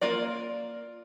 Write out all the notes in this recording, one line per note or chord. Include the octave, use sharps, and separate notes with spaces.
A#3 F4 A#4 D5